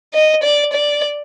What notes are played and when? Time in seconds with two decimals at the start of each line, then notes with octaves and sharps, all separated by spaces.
0.14 D#5
0.43 D5
0.73 D5